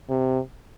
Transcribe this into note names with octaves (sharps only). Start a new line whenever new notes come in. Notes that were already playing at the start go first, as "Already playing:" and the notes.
C3